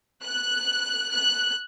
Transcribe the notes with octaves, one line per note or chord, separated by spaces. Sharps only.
F#6
F#6